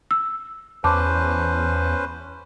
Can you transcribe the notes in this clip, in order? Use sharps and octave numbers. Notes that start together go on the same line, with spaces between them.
E6
E2 C#4 B4 C5 A5 D6